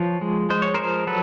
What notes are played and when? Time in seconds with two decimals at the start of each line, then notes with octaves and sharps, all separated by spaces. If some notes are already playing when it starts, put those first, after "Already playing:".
Already playing: F3 B4 C#5
0.21 G#3
0.50 G#3 C5
0.62 C#5
0.74 F3 A#4 C5
1.07 F#3 A4 B4